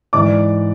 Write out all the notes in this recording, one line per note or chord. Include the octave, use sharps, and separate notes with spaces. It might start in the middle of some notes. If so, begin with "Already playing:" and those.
G#2 E3 D5 D6